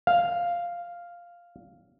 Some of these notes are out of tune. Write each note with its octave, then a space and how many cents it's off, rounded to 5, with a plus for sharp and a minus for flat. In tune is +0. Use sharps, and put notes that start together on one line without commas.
F5 +0